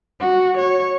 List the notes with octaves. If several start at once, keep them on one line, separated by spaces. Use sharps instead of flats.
F#4
C#5